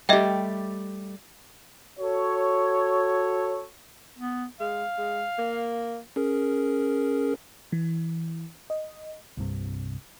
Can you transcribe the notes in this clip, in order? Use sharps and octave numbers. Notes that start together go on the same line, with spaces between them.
G3 A3 G4 D#5 E5 G5
F#4 A4 C#5
B3
G#3 F5
G#3
A#3
C#4 G#4 A#4
E3
D#5
C2 G2 C3